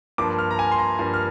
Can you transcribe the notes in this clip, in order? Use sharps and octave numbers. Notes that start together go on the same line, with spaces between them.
G2 F3 A#3 D6
F6
A#5
G#5
C6
A#5
G2 F3 A#3
F6